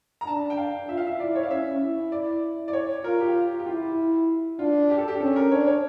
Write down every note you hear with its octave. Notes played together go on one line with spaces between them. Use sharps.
A#5
D4 A5
G5
F5
F4 E5
F5
E5
E4 D5
C#5
F5
C#4 E5
E4
D5
D5
C#5
F4 A#4
G4
G4
E4 F4
D4 F4
G4
A4
G4
C#4 A4
A#4
D4 C#5
C#5